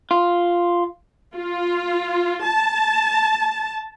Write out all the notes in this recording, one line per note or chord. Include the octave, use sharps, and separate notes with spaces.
F4
F4
A5